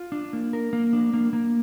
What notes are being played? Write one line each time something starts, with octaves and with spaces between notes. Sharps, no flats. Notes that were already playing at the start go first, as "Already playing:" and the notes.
Already playing: F4
D4
A#3
A#4
A#3
D4
A#3
A#3